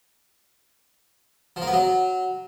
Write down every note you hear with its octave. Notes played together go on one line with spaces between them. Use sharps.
F3
A#3
B3
F#3